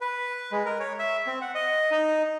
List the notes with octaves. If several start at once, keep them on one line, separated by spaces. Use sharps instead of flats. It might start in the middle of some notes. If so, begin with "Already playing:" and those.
B4
G#3
A#4
C#5
E5
C4
F#5
D#5
D#4